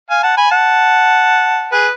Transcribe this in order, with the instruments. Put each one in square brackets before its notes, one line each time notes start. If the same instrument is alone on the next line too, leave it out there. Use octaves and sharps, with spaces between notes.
[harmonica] F5 G#5
F#5 A5
G#5 B5
F#5 A5
G#4 B4